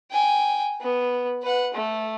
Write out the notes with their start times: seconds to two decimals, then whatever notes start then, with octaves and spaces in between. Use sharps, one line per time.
0.12 G5 G#5
0.81 B3
1.43 B4 F#5
1.74 A3